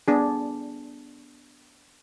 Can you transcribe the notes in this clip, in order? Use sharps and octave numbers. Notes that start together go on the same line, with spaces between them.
B3 D4 G#4